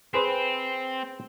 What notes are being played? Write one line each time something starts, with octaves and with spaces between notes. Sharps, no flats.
C4 G#4 B4 C5